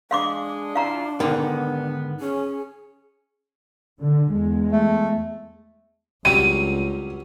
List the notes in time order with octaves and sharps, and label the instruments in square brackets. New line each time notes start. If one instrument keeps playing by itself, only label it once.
[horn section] G#3 G#4 [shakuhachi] D4 [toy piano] F5 C6 D6
[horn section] E4 F4 [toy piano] F5 A#5
[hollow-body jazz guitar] G#2 D3 D#3 [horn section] B3
[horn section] C#4 [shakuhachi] G#4
[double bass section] D3
E2 G#3
[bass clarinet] A3
[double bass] C#2 [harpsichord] F#3 G3 C4 [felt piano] D#7